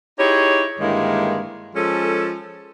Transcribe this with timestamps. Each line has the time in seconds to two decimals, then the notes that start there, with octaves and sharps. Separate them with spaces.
0.18 D#4 E4 G4 G#4 C#5
0.79 G2 D3 D#3 G#3 A#3 E4
1.75 F3 G#3 C#4 A4